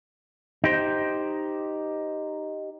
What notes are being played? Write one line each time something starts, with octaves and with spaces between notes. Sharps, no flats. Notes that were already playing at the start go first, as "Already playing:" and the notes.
D#4 G4 C5